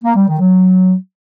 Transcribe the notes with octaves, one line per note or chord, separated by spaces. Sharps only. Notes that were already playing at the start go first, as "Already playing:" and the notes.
A#3
G3
D#3
F#3